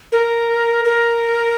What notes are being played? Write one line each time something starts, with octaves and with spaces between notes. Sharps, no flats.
A#4
A#4